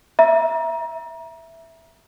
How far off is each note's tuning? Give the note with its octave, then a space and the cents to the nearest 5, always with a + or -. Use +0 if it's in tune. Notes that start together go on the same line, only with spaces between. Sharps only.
E5 +0 A#5 +30